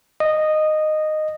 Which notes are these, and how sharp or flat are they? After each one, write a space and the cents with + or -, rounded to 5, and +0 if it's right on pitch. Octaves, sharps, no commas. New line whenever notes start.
D#5 -10